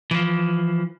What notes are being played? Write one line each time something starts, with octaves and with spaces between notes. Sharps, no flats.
E3 F3